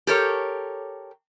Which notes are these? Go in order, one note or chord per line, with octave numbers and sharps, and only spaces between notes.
G4 A4 A#4 C#5